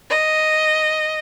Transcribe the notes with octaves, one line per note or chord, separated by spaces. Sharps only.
D#5